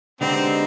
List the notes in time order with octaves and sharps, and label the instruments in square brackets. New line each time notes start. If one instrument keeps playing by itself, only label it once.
[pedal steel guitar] D3 G#3 B3 D#4 G4 [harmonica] C4